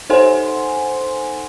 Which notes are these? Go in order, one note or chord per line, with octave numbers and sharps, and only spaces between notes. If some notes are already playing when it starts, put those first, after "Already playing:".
D#4 A4 C5 F#5 G#5 C6